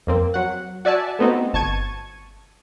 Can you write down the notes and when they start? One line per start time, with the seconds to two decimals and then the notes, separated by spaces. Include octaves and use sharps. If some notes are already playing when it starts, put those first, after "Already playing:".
0.07 F2 A#3 C4
0.34 F#3 F#5
0.85 F#4 D5 E5 G#5 A5
1.19 A3 B3 C4 D#4 F#4
1.53 G1 A5 C#6 G#6 D#7